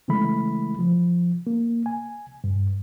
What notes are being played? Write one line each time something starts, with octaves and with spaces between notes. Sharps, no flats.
C#3 E3 G#3 A3 E4 B5
F3
A#3
G#5
G2